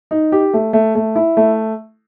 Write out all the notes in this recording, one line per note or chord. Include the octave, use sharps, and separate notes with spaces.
D#4
G4
A3
A3
A3
E4
A3